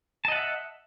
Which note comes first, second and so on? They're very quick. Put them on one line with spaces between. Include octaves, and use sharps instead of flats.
A5 D#5 F#5 E5